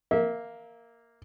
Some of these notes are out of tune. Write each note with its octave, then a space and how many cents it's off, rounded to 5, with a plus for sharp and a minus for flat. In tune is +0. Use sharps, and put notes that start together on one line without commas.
A#3 +0 E5 -25